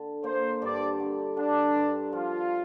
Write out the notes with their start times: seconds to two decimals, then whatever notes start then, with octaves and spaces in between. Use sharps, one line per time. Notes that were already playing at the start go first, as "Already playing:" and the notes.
Already playing: D3
0.24 A#3 C5
0.62 G2 D5
1.00 D3
1.37 D3 D4
1.75 G2
2.13 F3 F4